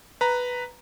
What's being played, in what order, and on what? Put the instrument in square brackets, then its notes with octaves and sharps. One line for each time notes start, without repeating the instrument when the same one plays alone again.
[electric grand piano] B4 A#5